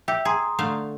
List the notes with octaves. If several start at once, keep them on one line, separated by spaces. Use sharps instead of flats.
G4 E5 E6
G#4 A#5 C6 D#6
D3 A3 F5